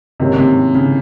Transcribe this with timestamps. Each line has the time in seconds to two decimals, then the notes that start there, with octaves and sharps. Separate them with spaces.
0.20 G#2 C3 D#3 A#3 C#4 G4
0.38 C3
0.74 C#3